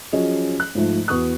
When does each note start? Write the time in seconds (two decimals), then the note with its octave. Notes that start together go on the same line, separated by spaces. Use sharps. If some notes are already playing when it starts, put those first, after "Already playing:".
0.13 F3 F#3 C#4 G#4 D#5
0.60 F#6
0.75 G#2 F3 A3
1.08 E2 B3 F#4 C#6 D#6 F#6